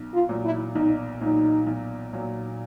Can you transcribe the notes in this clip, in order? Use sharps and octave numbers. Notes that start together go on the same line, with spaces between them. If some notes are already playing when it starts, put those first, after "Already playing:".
Already playing: B1
F4
A#2 F#3
E4
B1 D#4
A#2 F#3 D#4
B1
A#2 F#3